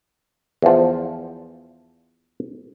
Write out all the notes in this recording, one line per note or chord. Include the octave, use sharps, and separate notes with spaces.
E2 F3